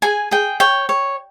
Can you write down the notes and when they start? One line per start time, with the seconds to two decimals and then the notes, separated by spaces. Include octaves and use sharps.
0.02 G#4 G#5
0.31 G#4 G5
0.60 C#5 G5
0.89 C#5